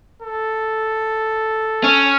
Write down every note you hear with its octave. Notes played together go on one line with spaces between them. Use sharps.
A4
C#4